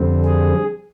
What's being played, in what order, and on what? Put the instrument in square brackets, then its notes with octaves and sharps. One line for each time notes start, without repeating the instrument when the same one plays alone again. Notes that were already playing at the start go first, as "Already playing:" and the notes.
Already playing: [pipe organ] F2 D3 G3 C4
G#4